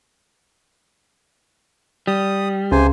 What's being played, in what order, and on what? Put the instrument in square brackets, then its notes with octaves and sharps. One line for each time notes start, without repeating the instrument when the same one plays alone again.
[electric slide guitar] G3 [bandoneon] D#6
[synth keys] C#2 [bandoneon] C3 C5 G#5